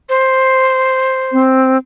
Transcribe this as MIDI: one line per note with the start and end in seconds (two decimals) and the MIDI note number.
0.09 1.42 72
1.32 1.77 60